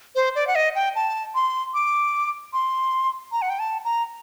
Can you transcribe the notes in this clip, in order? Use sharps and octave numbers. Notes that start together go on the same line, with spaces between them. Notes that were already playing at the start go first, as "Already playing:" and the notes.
C5
D5
F#5
D#5
G5
A5
C6
D6
C6
A#5
F#5
G5
A5
A#5